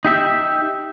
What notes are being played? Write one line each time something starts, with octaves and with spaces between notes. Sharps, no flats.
D#4 G4 E5